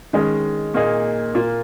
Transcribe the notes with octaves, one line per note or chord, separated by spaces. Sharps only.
D#3 G#3 C#4 G#4
A#2 A#3 D#4 G#4
A#2 A#3 F4